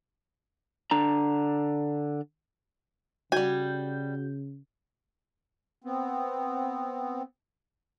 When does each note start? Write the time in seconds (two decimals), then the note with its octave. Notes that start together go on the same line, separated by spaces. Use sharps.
0.91 D3 D4 A#5
3.32 C#3 G3 F#4 G#5 G6
5.84 B3 C4